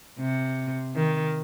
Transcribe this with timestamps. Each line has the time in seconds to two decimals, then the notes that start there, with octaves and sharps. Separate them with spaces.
0.19 C3
0.95 D#3